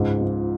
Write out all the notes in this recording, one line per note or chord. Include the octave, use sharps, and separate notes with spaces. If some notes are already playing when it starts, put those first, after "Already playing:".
Already playing: C#2 G#2
F3